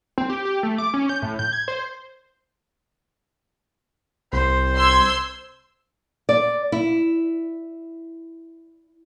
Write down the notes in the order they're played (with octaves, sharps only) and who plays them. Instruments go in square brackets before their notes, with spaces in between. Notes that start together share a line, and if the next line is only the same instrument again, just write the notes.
[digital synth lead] C4
G4
G4
A3
D6
C#4
G6
A2
G6
G#6
C5
[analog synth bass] C2 [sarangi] C5
[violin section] C6 E6 G#6
[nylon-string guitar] D5
E4